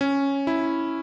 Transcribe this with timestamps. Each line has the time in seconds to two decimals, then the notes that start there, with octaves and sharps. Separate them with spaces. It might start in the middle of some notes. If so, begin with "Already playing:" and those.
0.01 C#4
0.47 E4